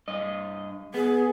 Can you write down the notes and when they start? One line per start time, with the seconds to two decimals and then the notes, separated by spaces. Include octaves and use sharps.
0.08 G2 D#5
0.94 B3 G#4